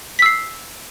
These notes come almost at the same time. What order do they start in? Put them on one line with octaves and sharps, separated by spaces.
B6 E6 C7